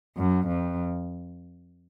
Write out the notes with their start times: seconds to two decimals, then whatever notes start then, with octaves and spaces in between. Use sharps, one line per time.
0.17 F#2
0.47 F2